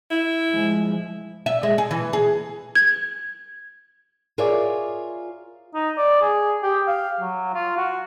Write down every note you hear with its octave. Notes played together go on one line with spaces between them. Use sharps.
E4
F3 G#3
E5
G#3
G#4
E3
G#4
G#6
F4 G#4 A#4 C#5 D5 E5
D#4
D5
G#4
G4
F5
F#3
F4
F#4